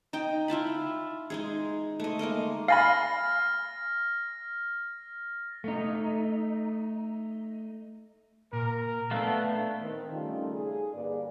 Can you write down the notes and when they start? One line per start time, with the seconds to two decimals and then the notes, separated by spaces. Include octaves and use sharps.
0.13 D#4 D#5 G5
0.48 E4 F4 A5 B5
1.30 G#3 D#4 G#4
2.00 A3 D#5
2.19 G#3 A#3 A#4 D#5
2.68 F5 G#5 B5 F6 A6 A#6
5.64 A3 D#4
8.53 A#2 A#4
9.11 A3 B3 D4 A4 F5
9.80 D#3 C4
10.11 C#3 G3 A3 C#4 D#4 F4
10.54 G#4
10.93 G2 D3 A#3 B4 D5